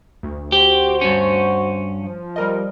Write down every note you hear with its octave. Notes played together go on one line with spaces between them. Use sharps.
D2
F#4 G4 C5
G2 C#4
F3
G3 A#4 D#5